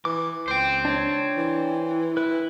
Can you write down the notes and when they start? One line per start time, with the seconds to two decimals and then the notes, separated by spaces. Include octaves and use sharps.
0.05 E3 D6
0.48 C#2 C5 G5
0.85 D4 C#5
1.37 E3
2.17 E4 B4